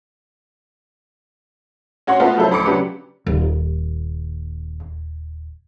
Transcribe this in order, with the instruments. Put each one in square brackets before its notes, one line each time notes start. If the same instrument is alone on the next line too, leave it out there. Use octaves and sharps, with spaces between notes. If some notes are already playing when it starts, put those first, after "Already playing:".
[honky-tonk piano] C#4 F#4 C#5 F#5 C6
A3 B3 F4 F#4
C#3 F3 F#3 E4 A4 C5
D2 B5 C6 D6 C#7
C#3 F#3 D4 G4 B4
[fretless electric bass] D#1 [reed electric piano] D#2